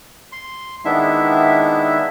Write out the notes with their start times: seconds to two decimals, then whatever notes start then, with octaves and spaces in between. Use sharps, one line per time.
0.32 C6
0.85 D#3 G#3 B3 D4 E4 E5